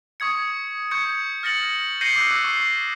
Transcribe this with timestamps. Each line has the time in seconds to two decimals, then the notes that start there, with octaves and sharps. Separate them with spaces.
0.20 C#6 D#6 G#6 C#7
0.91 C#6 G6 G#6 C#7
1.43 F6 A6 A#6 C#7 F#7
2.01 G6 A#6 C7 C#7 D#7 G7
2.16 D6 E6 F#6
2.44 C#6 C7